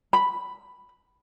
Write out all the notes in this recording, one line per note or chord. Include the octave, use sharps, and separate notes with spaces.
B5